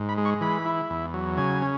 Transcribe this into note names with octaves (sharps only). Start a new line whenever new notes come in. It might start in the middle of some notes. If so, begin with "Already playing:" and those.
Already playing: G#2
B5
G#3
C#6
E3 B5
E4
E2
F#3
C#3 G#5
C#4